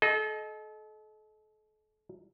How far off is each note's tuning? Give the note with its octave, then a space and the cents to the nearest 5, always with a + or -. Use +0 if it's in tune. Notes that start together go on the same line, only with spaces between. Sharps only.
A4 -35 D#5 +0